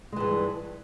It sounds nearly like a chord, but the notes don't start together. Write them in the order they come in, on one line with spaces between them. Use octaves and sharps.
G#3 E3 G2